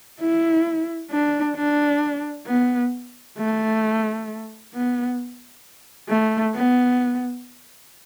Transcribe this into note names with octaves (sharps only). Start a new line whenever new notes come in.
E4
D4
D4
B3
A3
B3
A3
B3